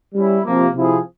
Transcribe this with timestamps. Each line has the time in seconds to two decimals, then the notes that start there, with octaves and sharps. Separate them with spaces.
0.14 G3 C#4 E4
0.44 C3 F3 A#3
0.73 C3 F3 C4 E4 G#4